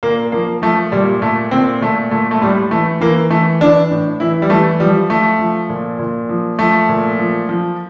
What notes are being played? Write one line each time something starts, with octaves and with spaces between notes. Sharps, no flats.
A#2 A#3
F3 A#3
F3 A3
A#2 G3
A#2 A3
A#2 C4
A#2 A3
A#2 A3
A3
A2 G3
E3 A3
E3 A#3
E3 A3
E3 D4
A2
E3 E4
G3
E3 A3
F3 G3
F3 A3
F3
A#2
A#2
F3
F3 A3
A#2
F3
F3